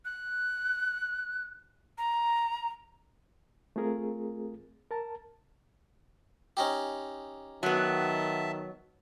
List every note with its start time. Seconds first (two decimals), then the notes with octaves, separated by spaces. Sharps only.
0.05 F#6
1.98 A#5
3.76 A3 C4 F4 G#4 A#4
4.91 A#4 A5
6.57 C#4 D#4 G4
7.63 D#3 F#3 B3 E5 A5